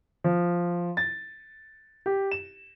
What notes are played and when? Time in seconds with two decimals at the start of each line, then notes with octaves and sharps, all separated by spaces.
0.24 F3
0.97 A6
2.06 G4
2.31 E7